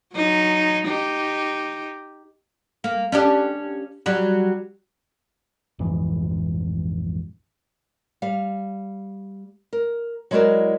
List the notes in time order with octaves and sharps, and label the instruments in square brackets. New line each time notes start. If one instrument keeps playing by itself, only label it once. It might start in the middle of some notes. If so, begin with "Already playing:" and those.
[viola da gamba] F#3 D#4
D#4 G4
[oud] A#3
C#4 D4 G4
F#3 G3
[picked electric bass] A#1 F2 G#2 E3
[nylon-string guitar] G3 F5
A#4
F#3 G#3 E4 F#4 A#4 D5